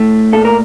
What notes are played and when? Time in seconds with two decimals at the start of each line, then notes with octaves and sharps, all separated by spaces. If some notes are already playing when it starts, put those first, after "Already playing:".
Already playing: A2 A3
0.33 A#2 A4
0.45 A#4